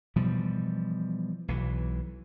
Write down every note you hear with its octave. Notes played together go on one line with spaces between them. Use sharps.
B2 E3 F3 G3
B1 E3